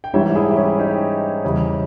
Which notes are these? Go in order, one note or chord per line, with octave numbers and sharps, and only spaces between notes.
G5
G#2 E3 G3 C#5 E5
E4 G#4
G4
C#4 E4
D#4 G4
E2 C#3 G3